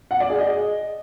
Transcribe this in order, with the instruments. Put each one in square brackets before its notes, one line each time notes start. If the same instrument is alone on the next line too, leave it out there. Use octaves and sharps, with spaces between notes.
[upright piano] F#5
D5
G#4
D#5